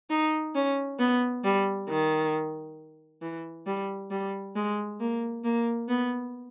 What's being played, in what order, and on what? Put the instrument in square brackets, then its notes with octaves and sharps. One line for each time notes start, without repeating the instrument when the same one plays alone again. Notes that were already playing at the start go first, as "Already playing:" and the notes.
[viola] D#4
C#4
B3
G3
D#3
E3
G3
G3
G#3
A#3
A#3
B3